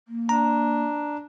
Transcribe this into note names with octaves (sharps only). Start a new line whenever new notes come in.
A#3
D4 A#5